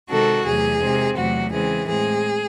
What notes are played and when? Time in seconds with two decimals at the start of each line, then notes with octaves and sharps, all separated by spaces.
0.09 C3 D#3 G#3 C4 F#4 A4
0.45 E2 C3 F#3 A3 G#4
0.80 C3 D#3 G#3 C4
1.16 E2 C3 F#3 A3 F#4
1.51 C#3 E3 G#3 C4 G#4
1.87 A2 G#3 C4 G#4